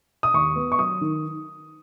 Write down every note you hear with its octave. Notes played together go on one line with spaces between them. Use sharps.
D#6
D#2 C#6
B3
C#6
F#3 D#6
D#3